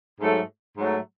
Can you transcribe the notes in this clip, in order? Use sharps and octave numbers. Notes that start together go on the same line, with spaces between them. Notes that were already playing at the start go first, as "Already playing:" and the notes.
G#2 F#3 A3
G#2 F#3 A3